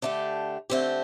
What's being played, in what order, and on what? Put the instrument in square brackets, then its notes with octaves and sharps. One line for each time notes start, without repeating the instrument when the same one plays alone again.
[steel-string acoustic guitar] D3 A3 D4 G4
D3 A3 C4 G4